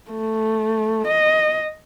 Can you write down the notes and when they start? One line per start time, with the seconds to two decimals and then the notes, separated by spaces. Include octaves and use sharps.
0.11 A3
1.07 D#5